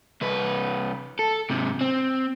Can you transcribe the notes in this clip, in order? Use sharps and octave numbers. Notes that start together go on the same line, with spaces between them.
C2 B4
A4
G#2 C3
C4